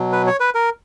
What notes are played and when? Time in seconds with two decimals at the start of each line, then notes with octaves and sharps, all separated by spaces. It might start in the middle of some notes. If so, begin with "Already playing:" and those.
Already playing: B2 F#3
0.12 B4
0.27 C#5
0.40 B4
0.55 A#4